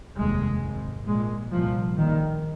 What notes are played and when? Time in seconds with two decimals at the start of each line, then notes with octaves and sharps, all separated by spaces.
0.16 F1 D#2 G#3
0.62 G#1 G#2
1.06 A#1 A#2 G#3
1.51 C2 A#2 F3
1.96 A#1 A#2 D#3